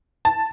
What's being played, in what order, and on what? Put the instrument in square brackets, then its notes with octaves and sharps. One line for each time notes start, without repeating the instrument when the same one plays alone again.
[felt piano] A5